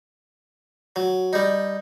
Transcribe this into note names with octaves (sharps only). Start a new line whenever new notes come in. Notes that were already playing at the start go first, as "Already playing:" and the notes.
F#3
G3 D#4